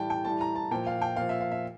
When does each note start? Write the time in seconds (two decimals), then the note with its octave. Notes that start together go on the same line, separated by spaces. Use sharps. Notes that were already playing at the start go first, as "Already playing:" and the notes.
Already playing: A2 E3 G3 G5 A5
0.10 G5
0.25 A2 E3 G3 A5
0.41 A#5
0.56 A5
0.71 A#2 F3 G5
0.87 F5
1.02 G5
1.16 A#2 F3 F5
1.29 E5
1.41 F5
1.51 E5